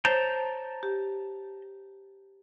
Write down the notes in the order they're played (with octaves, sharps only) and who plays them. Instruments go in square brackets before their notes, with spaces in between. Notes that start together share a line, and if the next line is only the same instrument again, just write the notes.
[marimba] C5 C#5 [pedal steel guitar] A5 A#5 G6
[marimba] G4